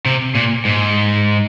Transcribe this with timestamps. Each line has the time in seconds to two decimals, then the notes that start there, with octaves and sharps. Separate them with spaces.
0.06 C3
0.35 A#2
0.65 G#2